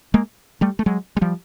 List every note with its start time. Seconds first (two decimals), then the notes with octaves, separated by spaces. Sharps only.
0.14 G#3 A#3
0.61 G3 A3
0.79 A3
0.86 F#3 G#3
1.17 G#3
1.21 F3 G3